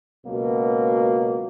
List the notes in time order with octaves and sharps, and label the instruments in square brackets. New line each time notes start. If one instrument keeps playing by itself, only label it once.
[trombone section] C#2 B2 F#3 A#3